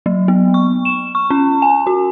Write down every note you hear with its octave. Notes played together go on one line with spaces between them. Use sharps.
F#3
B3
C#6
E7
C#6
C#4
G#5
F#4